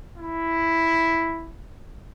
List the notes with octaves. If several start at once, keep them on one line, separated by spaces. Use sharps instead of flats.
E4